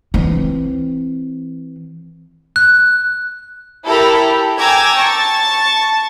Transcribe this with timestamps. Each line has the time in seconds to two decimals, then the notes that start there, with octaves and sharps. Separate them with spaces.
0.14 E3 C4
2.56 F#6
3.85 E4 G4 A4 A#4 A#5 B5
4.18 G4
4.58 G5 G#5 A#5 D6 E6 G#6
4.96 A5 C#6 A6